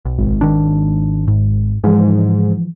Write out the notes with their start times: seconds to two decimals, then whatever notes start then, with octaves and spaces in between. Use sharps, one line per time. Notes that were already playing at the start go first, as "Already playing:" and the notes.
0.05 B1
0.18 G#1
0.41 D#3 D4
1.28 G#2
1.84 G#2 E3 F3